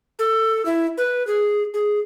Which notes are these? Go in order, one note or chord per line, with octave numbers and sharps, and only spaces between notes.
A4
E4
B4
G#4
G#4